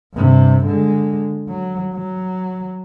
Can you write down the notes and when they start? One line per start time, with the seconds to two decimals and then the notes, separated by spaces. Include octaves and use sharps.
0.14 G2 C3
0.66 D3 G#3
1.49 F#3
1.94 F#3